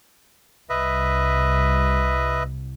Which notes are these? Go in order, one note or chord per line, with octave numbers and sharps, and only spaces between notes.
C2 B4 D#5 E5